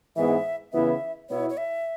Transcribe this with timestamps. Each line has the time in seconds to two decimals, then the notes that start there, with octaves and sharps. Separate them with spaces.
0.16 G#2 E3 G#3 B3 E5
0.72 C#3 E3 B3 E4 E5
1.29 B2 B3 E4 C#5
1.50 C#5
1.57 E5